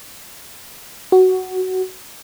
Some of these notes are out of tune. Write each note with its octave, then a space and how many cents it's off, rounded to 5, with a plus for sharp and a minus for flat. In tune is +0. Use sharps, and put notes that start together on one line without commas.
F#4 +10